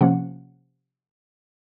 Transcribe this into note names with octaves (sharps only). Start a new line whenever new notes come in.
C3 F3 A#3 C#4 F#5